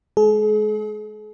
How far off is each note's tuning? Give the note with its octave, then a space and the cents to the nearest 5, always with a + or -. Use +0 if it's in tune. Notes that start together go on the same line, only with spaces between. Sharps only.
G#3 +20 G#4 +45